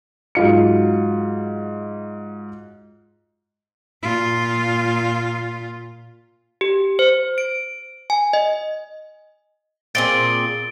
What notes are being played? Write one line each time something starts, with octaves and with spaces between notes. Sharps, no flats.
G#2 F#3 F4 C#7
A#2 F4
G4
C5
D7
G#5
D#5
A#2 C4 G#4 A6 D7 G7